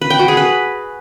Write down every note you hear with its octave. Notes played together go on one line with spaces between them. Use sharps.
B4
G5
F#4
G#4
B4